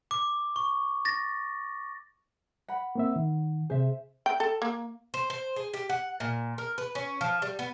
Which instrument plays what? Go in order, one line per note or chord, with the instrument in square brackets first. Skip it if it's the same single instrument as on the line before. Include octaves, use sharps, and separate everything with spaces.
[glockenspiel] D6
C#6
A6 A#6
[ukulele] F#5 B5
[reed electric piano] A#3 C4 E5
D#3
[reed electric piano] C3 G#4 [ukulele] C5 E5
[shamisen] G5
A4
A#3
[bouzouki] C5
C5
G#4
G4
F#5
A#2
A#4
B4
C#4
F3
G3
B3